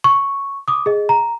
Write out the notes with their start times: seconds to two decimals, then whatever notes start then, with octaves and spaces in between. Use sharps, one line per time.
0.04 C#6
0.68 D6 D#6
0.86 G#4 D#5
1.09 A#5